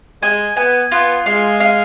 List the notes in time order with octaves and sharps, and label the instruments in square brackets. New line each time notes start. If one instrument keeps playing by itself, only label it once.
[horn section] G#3 [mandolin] G#5
[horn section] B3 [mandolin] G#5
[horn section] B3 [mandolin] F4
[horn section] G#3 [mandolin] F5
[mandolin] F5